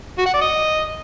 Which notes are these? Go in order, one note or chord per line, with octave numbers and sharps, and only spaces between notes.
F#4
F#5
D5
D#5